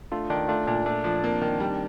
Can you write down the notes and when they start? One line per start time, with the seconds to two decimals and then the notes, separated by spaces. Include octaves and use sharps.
0.11 A3 D4 F4
0.30 D#3 D4
0.48 A3 D4 F4
0.67 A#2 D4
0.86 A3 D4
1.04 F3 D4
1.23 A#3 C4
1.42 D#3
1.60 G3